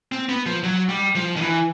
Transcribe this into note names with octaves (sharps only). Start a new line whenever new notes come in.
C4
B3
F3
F#3
G3
F3
D#3
E3